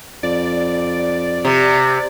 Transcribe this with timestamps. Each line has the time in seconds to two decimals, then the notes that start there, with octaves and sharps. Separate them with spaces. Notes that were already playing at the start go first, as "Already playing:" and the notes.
0.23 F2 D5
1.45 C3